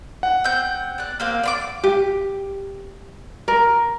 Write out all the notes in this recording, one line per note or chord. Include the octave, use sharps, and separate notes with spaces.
F#5
C4 G6
D5 F#6
A#3 C4 F5
D5 C6 D6
G4
A#4